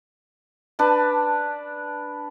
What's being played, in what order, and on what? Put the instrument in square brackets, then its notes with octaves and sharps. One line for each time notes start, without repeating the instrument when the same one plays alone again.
[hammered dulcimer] D4 B4 A5